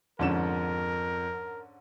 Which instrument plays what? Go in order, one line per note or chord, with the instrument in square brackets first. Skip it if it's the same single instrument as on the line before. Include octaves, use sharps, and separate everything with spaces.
[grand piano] F2 E7 [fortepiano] G#2 D3 C#4 [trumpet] A#4